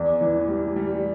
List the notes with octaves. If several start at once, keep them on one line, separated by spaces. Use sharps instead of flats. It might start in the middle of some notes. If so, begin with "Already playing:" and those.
Already playing: E2 D5
E3
G3
G3